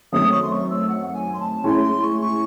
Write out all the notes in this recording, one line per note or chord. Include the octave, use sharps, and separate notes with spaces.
F#2 D#3 A3 C4 D#4 D#6
C#6
C6
C#6
E6
F#5
F#5
G#5
C6
A5
A2 G#3 C#4 E4 C6
C6
C#6
C#6